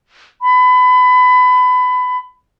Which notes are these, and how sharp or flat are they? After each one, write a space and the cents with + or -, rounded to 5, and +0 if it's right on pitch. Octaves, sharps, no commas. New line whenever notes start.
B5 +25